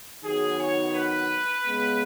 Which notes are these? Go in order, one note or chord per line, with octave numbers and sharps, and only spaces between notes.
D#3 F#3 B3 G#4
C#5
B4
C#3 G#3 B3